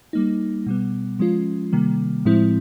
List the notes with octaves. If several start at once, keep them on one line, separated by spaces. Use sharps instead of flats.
G3 A#3 D#4
B2 G3 B3
F3 G#3 C#4 F4
C3 D#3 G3 A#3
A2 F3 G#3 C4 E4